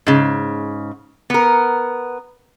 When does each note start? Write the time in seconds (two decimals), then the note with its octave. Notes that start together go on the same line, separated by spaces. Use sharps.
0.07 G#2 C#3
1.30 B3 A#4